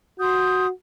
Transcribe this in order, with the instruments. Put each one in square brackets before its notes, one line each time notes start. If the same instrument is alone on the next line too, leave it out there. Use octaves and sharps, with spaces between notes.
[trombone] F#4 [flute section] C6 D#6 G6